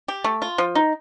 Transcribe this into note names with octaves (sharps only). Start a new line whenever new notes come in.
G4
A3
F4
F3
D#4